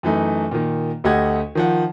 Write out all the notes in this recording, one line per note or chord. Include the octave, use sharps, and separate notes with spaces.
F#2 E3 A3 D#4
A#2 D#3
D2 A3 G4 D#5 F#5 G#6
D#3 F3 F#5